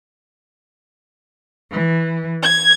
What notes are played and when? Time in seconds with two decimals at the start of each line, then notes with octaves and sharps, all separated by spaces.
1.72 E3
2.42 G#6